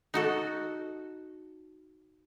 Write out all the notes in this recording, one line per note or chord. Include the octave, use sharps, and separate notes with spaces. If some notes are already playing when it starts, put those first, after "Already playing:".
D#4 F#4 A4